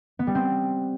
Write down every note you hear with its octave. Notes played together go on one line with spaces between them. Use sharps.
B3
G3
C4